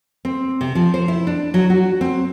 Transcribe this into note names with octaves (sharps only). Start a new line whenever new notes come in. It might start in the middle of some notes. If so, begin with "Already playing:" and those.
C4
C3
F3
C5
E4
D4
F#3
F#4
C4